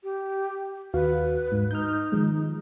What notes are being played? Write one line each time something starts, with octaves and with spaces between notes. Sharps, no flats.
G4
D#2 F#4 B4 F5
G#2
D#4 F6 G6
D#3 F3 G#3